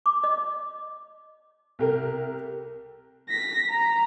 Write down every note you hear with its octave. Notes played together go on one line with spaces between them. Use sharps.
D6
D#5
C2 G4 A#4
A#6 B6
A#5